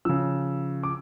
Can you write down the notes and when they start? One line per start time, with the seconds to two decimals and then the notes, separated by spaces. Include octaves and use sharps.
0.05 C#3 F3 E6
0.83 D6